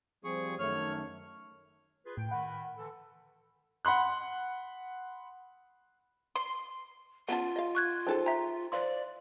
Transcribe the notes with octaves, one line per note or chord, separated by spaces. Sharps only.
F3 G3 C4 G#4 C#6
F#2 D#3 A3 C#5 F6
F4 G#4 B4
A2 G5
D#3 F#5 B5
D3 E3 A4
F#5 B5 C6 F#6
C6
B3 C#4 F4 F#5 A5
D#5 F5
C#6 F#6 G#6
D#4 G#4 A4 C5 G5 A5
E5 G5 A#5
C5 D5 F5 C6